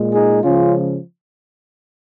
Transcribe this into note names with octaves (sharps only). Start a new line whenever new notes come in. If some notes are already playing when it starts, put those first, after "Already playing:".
Already playing: A#2 G#3
D#4 G#4
C#3 F3 G#3 C#4 F4